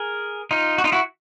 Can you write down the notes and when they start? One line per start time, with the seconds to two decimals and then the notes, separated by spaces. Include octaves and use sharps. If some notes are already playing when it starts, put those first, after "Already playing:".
Already playing: G#4 A#4
0.51 D#4 F4
0.78 F#4
0.84 D#4 F4
0.92 E4 F#4